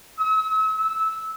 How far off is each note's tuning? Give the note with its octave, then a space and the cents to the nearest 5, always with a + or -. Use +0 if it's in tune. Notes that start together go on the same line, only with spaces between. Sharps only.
E6 -40
E6 -15